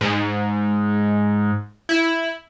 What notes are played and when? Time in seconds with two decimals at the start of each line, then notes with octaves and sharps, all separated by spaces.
0.01 G#2
1.89 E4